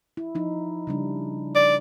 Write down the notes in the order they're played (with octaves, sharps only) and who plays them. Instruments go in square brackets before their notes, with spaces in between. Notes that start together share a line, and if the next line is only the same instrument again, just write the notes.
[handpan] E4
F3 D#4
C#3 G3 D4
[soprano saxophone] D5